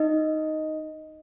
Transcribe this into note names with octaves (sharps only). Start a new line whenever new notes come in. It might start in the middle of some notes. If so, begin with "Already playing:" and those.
Already playing: D#4 D#5